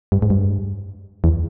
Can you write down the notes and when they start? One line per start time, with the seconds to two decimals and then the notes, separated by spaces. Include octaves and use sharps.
0.12 G2
0.22 G#2
0.30 G2
1.24 E2